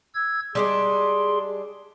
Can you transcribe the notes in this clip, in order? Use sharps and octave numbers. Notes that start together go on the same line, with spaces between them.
E6 G#6
G3 G#3 D4 G#4 C6